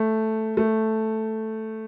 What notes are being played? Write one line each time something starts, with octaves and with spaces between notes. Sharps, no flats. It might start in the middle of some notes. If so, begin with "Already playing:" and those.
Already playing: A3
A3